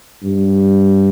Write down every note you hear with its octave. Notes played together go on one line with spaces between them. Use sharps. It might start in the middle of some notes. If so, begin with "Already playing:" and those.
G2